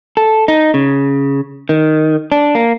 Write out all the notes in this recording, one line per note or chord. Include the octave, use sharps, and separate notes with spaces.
A4
D#4
C#3
D#3
D4
A#3